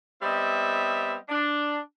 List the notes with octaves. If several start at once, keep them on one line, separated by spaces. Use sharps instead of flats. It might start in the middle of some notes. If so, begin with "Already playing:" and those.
G3 B3 C4 D#5 E5
D4